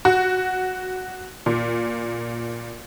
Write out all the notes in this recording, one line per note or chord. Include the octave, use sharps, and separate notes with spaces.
F#4
A#2